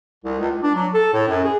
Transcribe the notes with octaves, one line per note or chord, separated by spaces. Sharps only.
C2
C#2
C#2
D4
F#3
A4
A2
F#2
G#4